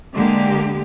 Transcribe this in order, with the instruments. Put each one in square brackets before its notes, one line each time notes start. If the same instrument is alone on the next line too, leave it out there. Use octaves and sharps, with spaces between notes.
[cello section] D3 G#3 A#3 G4